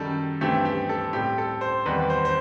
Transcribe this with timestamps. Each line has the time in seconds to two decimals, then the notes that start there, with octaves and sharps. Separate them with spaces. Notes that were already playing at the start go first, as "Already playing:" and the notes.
Already playing: F#2 D#3 G3 A4
0.41 G2 E3 A3 C4 G4
0.65 G4
0.89 A4
1.13 A2 G3 C4 G4
1.38 A4
1.61 C5
1.86 E2 D#3 G3 C4 B4
2.10 C5
2.25 C5